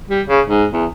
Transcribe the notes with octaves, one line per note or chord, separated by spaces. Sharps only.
G3
C#3
G#2
E2